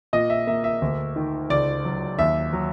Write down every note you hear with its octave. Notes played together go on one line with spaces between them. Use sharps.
A#2 D#5
E5
A#3 E5
E5
D2
D#3
C#2 D5
F#3
D#2 E5
F#3